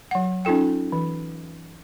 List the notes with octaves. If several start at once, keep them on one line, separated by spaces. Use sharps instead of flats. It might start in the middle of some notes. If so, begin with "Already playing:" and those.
F#3 F#5
C#4 D#4 F4 A4 G5
E3